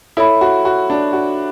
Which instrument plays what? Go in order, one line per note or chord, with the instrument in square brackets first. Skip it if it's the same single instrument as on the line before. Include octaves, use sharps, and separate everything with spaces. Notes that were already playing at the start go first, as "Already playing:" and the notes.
[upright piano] E4 [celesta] A4 C#5 E5 B5
[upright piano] F#4
F#4
D4
F#4